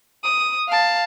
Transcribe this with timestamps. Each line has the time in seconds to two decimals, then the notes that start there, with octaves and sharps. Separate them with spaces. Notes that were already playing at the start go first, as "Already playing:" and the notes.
0.24 D#6
0.69 F5 A5